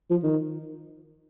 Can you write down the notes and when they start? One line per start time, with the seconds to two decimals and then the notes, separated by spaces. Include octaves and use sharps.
0.10 F3
0.24 D#3